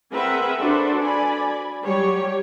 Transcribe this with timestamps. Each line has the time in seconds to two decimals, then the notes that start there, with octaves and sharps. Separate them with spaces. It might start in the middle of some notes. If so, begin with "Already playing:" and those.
0.13 C4 G#4 A#4 B4 E5 F#5
0.61 D4 F#4 A4 B4 C5
1.00 D5 G#5 B5
1.84 F#3 G3 G4 C#5